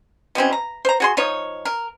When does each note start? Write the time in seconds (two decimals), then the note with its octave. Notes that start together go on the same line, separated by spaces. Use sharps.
0.35 B2 E3 C4 C#4
0.53 A#5
0.85 C5 A#5
1.00 F#4 G#4 C6
1.17 F3 D#4 C#5
1.65 A#4